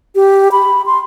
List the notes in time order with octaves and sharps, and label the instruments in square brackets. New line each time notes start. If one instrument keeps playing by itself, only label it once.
[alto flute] G4
B5
C6